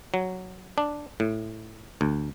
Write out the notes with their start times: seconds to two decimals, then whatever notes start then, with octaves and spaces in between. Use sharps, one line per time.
0.14 F#3
0.78 D4
1.20 A2
2.01 D2